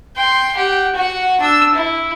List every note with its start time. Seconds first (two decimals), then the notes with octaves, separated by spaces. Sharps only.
0.16 G5 C6
0.55 G4 F#5
0.95 F#4 F#5
1.40 D4 E6
1.74 E4